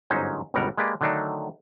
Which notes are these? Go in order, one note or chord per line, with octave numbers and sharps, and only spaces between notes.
G1 G#2 F#3 C#4 D#4 C5
G1 C#2 B2 G3 A#4 F#5
G#3 A#3 G4 B4 D5
D3 D#3 F#3 A3 D4 D#4